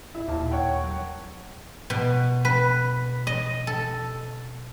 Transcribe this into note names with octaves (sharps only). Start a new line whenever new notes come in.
E4
D#2 A#2 A5
C#5 F#5 G5
F#3
B2
B4
D#5
A4